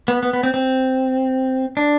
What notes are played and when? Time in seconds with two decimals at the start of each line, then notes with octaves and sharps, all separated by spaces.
0.08 B3
0.23 B3
0.33 B3
0.43 C4
0.54 C4
1.77 D4